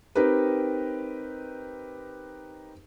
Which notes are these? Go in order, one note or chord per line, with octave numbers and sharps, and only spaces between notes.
C4 D#4 G4 A#4 B4